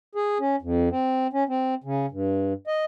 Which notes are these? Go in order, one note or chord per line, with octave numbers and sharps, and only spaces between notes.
G#4
C#4
F2
C4
C#4
C4
C#3
G2
D#5